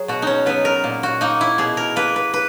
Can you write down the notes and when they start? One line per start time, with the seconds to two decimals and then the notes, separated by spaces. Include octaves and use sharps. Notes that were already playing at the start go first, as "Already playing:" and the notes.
Already playing: F#3 G#4
0.08 B2 F#4
0.22 C#4 D#4
0.46 F#3 B3 B4
0.65 A#4
0.84 A#2
1.03 F#4
1.21 A#3 D#4
1.41 E4
1.58 B2 G#4
1.77 A#4
1.96 A#3 B4
2.16 B4
2.34 B4